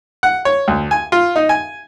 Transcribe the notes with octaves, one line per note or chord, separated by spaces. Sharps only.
F#5
C#5
D2
G#5
F4
D#4
G#5